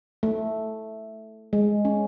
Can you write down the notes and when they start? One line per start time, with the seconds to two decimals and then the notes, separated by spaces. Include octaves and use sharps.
0.23 A3
1.53 G#3
1.85 C#4